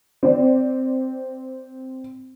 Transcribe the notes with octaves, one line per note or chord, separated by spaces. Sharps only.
C4 D5